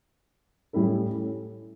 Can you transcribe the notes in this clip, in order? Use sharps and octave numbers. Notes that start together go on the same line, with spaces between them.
A2 G3 C#4 E4 A4